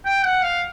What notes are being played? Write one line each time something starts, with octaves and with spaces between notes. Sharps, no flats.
G5
F#5
F5